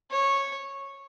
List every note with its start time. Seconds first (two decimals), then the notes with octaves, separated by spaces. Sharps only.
0.11 C#5